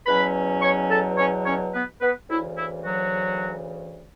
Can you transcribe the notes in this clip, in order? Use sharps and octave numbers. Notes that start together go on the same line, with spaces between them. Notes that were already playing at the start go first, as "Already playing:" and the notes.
E2 B2 F#3 C#4 B4 B5
C#5 C#6
A4 A5
C#4 C#5
C#4 C#5
B3 B4
B3 B4
D2 C#3 E3 E4
E4
F#3 F#4